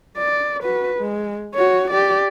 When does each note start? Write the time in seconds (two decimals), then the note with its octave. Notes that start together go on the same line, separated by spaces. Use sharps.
0.17 D5
0.63 F#4 B4
0.99 G#3
1.54 F#4 C#5
1.91 G4 D5